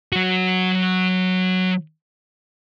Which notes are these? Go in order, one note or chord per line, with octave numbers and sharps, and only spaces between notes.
F#3 F#4